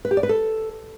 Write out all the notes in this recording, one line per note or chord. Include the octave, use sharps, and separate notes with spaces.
B4
G4
D5
B4
A4